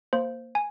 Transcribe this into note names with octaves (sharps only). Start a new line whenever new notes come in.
A#3 C5
G#5